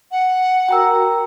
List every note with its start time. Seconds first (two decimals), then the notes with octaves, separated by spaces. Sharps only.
0.12 F#5
0.68 F#4 A#4 G5 A#5 E6